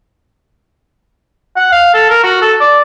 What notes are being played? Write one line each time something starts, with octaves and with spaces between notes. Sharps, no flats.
F#5
F5
A4
A#4
F#4
A4
D5